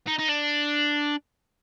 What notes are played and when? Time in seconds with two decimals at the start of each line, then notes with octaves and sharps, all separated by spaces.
0.08 D#4
0.19 D#4
0.29 D4